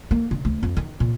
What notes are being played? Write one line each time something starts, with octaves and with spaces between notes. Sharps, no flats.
A#3
D3
D2
F2
D#3
A#2